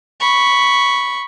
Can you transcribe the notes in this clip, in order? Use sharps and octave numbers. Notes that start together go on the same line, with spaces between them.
B5 C#6